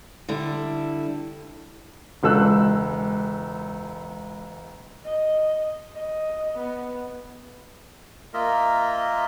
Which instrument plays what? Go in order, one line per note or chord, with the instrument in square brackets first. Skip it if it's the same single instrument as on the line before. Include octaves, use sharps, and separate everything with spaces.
[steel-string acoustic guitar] D3 G3 E4
[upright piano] E1 C#2 A4 E6 F#6
[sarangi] D#5
D#5
B3
[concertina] A#3 F4 A#4 D#5 E5